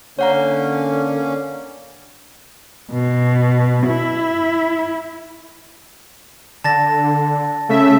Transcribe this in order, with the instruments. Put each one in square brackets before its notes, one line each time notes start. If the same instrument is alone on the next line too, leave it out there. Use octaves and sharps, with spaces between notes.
[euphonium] D3 [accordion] A#3 C#4 [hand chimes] C#5 F#5 A#5
[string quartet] B2
E4
[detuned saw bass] D3 [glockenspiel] A5 A6 A#6
[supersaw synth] C#3 E5 [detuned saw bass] A3